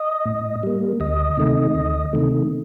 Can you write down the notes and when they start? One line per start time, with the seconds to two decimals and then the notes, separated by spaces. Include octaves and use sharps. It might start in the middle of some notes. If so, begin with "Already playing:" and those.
Already playing: D#5
0.25 A2
0.63 G3 A#3
1.00 D2 D#5
1.37 C3 D#3 A3
1.75 D2
2.13 C3 D#3 A3